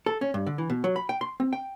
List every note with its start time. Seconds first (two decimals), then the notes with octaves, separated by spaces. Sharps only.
0.06 A4
0.21 C#4
0.34 G2
0.46 D3
0.58 E3
0.70 B2
0.84 F#3
0.96 B5
1.09 G5
1.21 C6
1.40 C4
1.53 G5